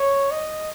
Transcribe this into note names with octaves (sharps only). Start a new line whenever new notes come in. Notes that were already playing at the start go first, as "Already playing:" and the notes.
Already playing: C#5
D#5